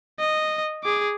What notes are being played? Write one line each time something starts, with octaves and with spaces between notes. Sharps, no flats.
D#5
G#4 D6